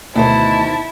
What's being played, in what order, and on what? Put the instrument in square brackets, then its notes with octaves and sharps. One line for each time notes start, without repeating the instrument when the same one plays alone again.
[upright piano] D2 [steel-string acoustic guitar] B2 D#3 C5 [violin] E4 [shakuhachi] A5